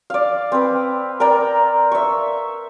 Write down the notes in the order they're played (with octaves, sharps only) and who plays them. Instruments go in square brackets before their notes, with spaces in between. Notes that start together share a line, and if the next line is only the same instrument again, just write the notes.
[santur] D5 F5
C4 B4
A#4 D5 G5 A#5
E5 C#6